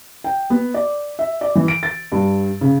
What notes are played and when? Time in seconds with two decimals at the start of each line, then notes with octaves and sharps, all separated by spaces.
0.24 G5
0.50 B3
0.74 D5
1.19 E5
1.41 D5
1.55 E3
1.68 D7
1.83 A6
2.12 G2
2.61 C#3